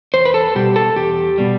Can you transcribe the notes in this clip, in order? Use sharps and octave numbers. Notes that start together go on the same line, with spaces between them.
E2 C5
B4
A4
B2 G3 G4
A4
E2 G4
B2 G3